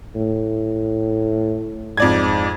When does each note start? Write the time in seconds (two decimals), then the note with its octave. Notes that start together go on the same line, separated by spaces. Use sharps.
0.15 A2
1.97 F2 G#2 D5 G#6